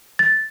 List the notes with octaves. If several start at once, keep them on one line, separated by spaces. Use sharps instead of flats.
A6